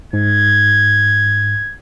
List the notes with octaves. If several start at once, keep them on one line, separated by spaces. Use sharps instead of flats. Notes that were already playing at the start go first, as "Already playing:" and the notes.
G#2 G#6